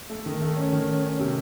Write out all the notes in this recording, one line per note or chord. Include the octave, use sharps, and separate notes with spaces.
A3
D#3
A3
C#4
D#3
C#4
C#4
C3